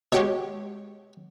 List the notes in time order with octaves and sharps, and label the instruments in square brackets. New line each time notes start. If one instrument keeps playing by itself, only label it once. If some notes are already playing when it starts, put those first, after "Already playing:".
[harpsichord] B2 [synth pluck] G#3 G4 C#5